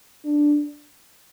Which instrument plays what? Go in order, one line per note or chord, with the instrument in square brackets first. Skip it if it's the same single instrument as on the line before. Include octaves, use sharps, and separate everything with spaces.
[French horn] D4